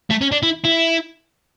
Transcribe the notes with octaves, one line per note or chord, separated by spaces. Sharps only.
A3
C#4
D4
E4
E4